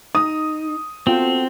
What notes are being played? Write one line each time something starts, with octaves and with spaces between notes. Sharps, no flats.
D#4 D#6
B3 C4 F4 F#4 A4 G5